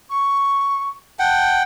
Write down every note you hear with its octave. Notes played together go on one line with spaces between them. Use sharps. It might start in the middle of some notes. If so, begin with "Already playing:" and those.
C#6
F#5 G5 A5